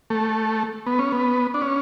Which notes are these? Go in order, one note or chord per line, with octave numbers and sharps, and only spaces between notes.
A3
B3
C#4
B3
D4
C#4